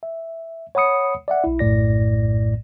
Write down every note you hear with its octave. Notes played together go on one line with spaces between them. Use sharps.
E5
C#5 F#5 B5 D#6 C#7
D5 E5 F#5
B1 E4
A#1 F#2 A2 D5 A#6